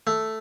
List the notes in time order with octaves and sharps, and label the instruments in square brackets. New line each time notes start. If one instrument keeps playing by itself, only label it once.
[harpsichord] A3